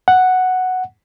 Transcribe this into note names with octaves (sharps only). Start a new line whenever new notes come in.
F#5